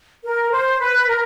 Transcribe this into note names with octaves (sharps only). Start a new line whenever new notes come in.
A#4
C5
B4
A#4